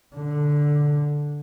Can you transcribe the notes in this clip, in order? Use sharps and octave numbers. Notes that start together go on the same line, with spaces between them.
D3